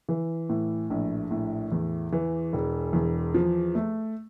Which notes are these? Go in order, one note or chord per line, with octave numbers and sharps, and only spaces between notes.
E3
A2
A#1
A2
E2
E3
E1
E2
F3
A3